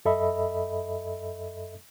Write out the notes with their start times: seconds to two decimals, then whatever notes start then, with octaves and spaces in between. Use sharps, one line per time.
0.05 F#2 A4 D#5 E5 B5